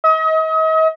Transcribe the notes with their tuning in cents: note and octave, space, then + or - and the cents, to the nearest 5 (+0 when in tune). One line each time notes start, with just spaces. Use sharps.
D#5 +40